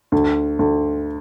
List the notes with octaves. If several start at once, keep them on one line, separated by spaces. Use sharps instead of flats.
D2
D2